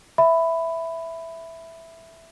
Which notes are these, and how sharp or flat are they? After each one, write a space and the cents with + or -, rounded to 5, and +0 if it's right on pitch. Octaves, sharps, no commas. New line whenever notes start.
E5 +0 B5 +10